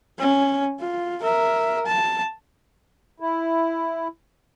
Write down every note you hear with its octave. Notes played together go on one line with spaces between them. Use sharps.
C#4
F4
A#4 E5
A5
E4